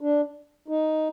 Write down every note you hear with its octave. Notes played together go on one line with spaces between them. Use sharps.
D4
D#4